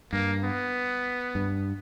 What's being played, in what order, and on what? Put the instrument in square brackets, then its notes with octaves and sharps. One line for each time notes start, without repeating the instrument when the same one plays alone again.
[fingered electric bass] G2 [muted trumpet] A#3
[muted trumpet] B3
[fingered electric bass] G2